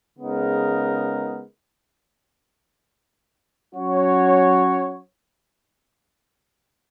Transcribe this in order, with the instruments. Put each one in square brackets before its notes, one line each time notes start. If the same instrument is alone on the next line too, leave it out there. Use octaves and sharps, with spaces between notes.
[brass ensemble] C#3 G#3 B3 D#4 A#4
F#3 C#4 F#4 C#5